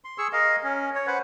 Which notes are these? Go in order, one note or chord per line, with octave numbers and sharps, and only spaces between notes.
C6
G#4 C#6 E6
A#4 D#5 F5
C#4
C#5
B4 C5 F#5